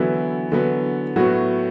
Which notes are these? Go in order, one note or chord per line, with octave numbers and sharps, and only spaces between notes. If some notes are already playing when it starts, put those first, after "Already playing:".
Already playing: D3 E3 F#3 B3 E4
D3 F#3 B3
A2 F#3 B3 F#4